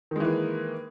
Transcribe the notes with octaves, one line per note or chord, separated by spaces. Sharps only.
D#3 E3 G#3 A#3